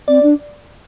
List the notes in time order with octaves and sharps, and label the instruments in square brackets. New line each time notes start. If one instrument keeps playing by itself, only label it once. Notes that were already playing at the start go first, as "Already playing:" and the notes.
[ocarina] C4 [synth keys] D5
[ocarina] D4